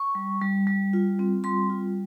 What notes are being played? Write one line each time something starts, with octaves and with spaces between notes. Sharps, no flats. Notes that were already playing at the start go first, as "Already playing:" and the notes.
Already playing: C#6
G3
G3
G3
F4
C4
G3 C6
F4